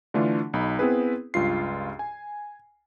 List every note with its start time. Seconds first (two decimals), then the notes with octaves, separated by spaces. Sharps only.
0.14 D3 E3 A3 D4 F4
0.53 B1 D#4 B5
0.79 B3 C4 E4 G#4 B4
1.34 C#2 G2 F4 C7
1.99 G#5